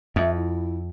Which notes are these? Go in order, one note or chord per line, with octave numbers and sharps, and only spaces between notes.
F2 E5
E4